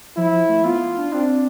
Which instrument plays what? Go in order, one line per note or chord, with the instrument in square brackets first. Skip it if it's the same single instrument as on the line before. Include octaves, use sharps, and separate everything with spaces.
[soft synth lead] F3 [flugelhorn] E4
[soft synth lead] F3
A3
[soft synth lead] B3 [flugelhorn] F4
[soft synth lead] D4
[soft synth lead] C4 [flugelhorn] D4